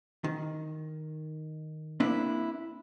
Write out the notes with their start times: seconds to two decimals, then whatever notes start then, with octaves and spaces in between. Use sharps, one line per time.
0.24 D#3
2.00 A#3 C4 D4 E4 B4